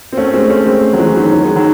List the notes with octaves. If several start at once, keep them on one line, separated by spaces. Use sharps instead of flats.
C4
A3 C#4
G#3 C4
A3 C#4
G#3 C4
F#3
E3 G#3
D#3 F#3
F#3
G#3
D#3 F#3